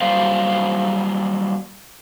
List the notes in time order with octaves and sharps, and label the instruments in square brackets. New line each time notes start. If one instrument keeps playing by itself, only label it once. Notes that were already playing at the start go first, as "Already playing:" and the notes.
[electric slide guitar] F#3 G3 A#3 C5 D5 F5